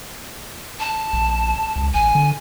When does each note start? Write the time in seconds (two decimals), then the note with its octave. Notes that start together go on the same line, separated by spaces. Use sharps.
0.80 A5
1.13 A#1
1.76 C#2
1.94 A1 G#5
2.15 D3